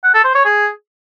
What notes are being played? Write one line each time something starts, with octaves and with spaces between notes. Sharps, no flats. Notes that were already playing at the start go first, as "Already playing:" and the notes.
F#5
A4
C5
C#5
G#4